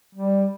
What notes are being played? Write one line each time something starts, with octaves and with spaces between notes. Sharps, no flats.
G3